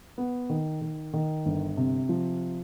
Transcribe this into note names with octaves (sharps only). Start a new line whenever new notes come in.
B3
D#3
D#3
D#3
G1
C3
F3